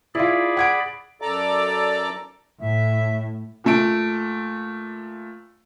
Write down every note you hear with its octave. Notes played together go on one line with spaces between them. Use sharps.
E4 F4 G#4 D5 B5
F#5 G#6 D7
F#2 A4 D5 A#5 D6
A2 E5
A#2 A3 D7